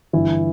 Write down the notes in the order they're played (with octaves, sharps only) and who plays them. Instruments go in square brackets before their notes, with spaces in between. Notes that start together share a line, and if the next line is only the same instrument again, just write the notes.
[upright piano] G1 [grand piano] E3 E4